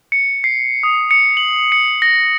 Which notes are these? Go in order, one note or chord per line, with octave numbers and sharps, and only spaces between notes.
C#7
C7
D#6
C#7
F#7
C#7
A#6